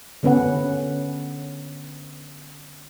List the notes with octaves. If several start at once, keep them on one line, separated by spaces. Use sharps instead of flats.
D3 B3 C#4 B4 F#5